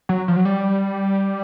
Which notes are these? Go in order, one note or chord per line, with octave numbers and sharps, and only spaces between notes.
F#3
F3
F#3
G3